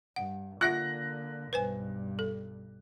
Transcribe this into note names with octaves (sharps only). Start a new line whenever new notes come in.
G2 F#5
D3 A#3 F4 E5 F#5 F#6 A#6
B1 G2 B4 C5 G#5
A4